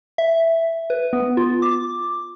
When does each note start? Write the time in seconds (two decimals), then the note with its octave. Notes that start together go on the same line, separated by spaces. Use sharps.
0.18 E5
0.90 B4
1.13 B3
1.37 F4
1.62 D6